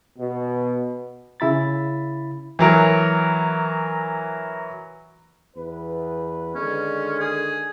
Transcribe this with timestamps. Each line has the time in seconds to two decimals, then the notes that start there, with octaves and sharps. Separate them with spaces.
0.18 B2
1.40 C#3 E4 B5 A6
2.59 E3 F#3 A#4
5.56 E2 B4
6.55 D3 D#3 G#3 C#4
7.20 G#4